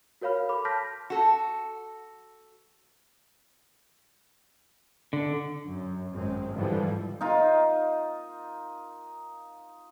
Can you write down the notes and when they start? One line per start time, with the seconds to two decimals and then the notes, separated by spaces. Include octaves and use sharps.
0.21 F#4 A#4 C#5 F5 B5 F6
0.49 A4 B5 D6
0.65 A5 C6 F6 G6 A#6 B6
1.10 F#4 A4
5.13 D3
5.68 F#2
6.13 G#1 F#2 G#3 C4
6.52 G#2 D3 E3 F3 G3
7.21 D#4 F4 A#4